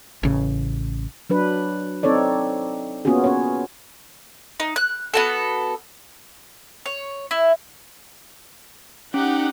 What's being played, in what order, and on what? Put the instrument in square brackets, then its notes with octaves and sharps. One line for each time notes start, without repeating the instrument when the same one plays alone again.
[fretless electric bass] A1 C#3
[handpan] F#3 D4 B4
C4 D#4 A4 C#5 D5
A#3 B3 C#4 F4 F#4 G#4
C#4 C#5
[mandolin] D#4
F#6
B3 F#4 A4
C#5
E4
[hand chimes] C#4 [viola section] D#4 F#5 [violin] G4